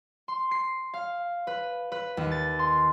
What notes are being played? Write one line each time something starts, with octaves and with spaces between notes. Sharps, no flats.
C6
C7
F5
B4
B4
D#2
A6
C6